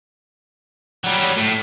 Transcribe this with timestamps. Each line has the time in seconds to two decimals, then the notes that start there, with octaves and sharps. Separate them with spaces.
1.04 F#3 G3
1.37 A2